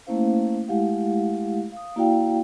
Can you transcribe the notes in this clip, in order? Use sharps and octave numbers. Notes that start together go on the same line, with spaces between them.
A3 A#3 C#4 E4 C5 F5
G#3 A3 E4 G4 F5 F#5
F5 D#6
A#3 E4 F#4 D5 F5 G5